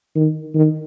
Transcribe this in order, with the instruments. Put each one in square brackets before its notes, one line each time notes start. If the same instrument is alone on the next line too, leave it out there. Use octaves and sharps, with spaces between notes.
[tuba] D#3
D#3